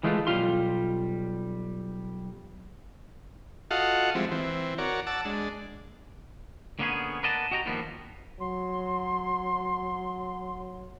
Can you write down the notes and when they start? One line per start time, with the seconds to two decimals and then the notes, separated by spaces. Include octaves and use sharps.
0.03 E3 G#3 A3 F4
0.27 B1 G3 F4 F5 C6
3.71 F4 F#4 A4 D#5 F5 F#5
4.15 F3 G3 G#3 C4 E4
4.32 E3 C4
4.78 F#4 A#4 C#5 D5
5.07 F#5 A5 D6 E6
5.25 G#3 D4
6.79 D3 A#3 B3 C#4 G#4
7.23 A#4 B4 D5 D#5 F#5 A5
7.51 F#4 G4 D#5 G5 A#5
7.66 D#3 F3 G3 A#3 B3 D4
8.40 F#3 C6